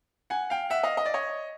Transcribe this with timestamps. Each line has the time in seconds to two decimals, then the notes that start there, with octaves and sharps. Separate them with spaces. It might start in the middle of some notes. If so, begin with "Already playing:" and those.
0.30 F#5 G#5
0.50 F5 G5
0.70 E5 F#5
0.83 D#5 F5
0.97 D#5
1.06 D5
1.14 C#5 D#5